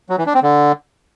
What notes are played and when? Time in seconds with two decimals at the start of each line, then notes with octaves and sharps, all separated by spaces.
0.10 F#3
0.18 E3
0.26 D4
0.34 C4
0.43 D3